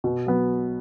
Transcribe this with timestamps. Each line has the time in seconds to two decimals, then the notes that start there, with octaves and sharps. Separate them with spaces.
0.04 B2
0.27 F#3 B3